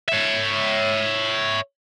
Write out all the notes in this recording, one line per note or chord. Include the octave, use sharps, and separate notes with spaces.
C#5 E5